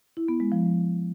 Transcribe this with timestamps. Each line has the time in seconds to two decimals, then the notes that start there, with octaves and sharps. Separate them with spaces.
0.17 E4
0.28 B3
0.40 G#3
0.52 F3